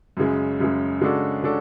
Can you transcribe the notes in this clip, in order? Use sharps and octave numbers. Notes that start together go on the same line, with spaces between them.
F#2 C#3 G#3
F#2 C#3 G#3
C#3 G#3 D4 F#4 A4
C#3 G#3 D4 F#4 A4